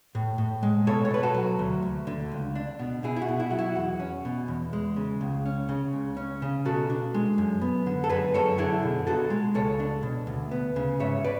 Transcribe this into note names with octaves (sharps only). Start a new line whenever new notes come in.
A2
A2
G#3
B2 A4 C#5
C#5
B2 B4
F#4 A4
F#3
D2
D2
D3
C#2
D4
B2
B2 E4 G#4
E4
F#4
B2
E4
F#3 F#4
E4
E2 F#4
C#4
B2
E2
G#3
C#3
C#2
C#4
C#3
C#2
C#4
C#3
B2 F#4 A4
D4
G#3
F#2
B3
D3
A4
F#2 G#4 B4
F#2 A4 C#5
D3 E4 G#4
B2
B2 F#4 A4
G#3
C#2 A4 C#5
D4
B2
D2
B3
C#3
G#2 C#5 E5
B4 D5